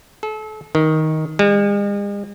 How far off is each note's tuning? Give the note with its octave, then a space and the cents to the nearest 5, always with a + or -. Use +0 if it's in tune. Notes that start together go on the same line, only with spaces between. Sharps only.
A4 -35
D#3 +10
G#3 -45